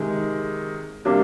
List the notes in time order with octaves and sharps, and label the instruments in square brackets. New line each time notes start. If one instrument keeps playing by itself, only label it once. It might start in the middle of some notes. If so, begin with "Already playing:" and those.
Already playing: [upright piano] C3 D#3 G#3
C3 G3 A#3 D4 G4